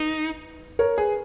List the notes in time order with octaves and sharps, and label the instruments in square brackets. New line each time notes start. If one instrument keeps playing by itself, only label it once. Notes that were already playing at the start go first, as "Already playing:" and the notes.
Already playing: [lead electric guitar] D#4 [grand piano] B4
[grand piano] A#4 C#5
G#4 B4